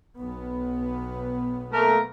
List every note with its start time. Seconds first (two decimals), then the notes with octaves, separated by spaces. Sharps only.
0.18 B1 B3
1.72 A3 A#3 A#4